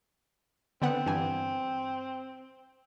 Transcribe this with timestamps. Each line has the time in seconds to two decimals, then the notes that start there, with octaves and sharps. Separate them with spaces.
0.82 D3 B3 C4 F#5
1.06 G2 E3 G#5